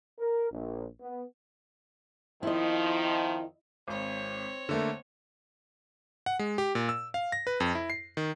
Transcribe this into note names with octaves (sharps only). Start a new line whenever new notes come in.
A#4
A#1
B3
F2 D#3 F3 E4 D#5
G#1 C4 C#5
D3 A3 A#3
F#5
G#3
G4
A#2
E6
F5
A#6
B4
F2
E4
C7
D#3